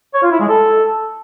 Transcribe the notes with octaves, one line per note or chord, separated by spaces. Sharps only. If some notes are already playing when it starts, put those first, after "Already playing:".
C#5
F4
E4
G#3
A4